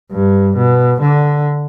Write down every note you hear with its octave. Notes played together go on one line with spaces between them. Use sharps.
G2
B2
D3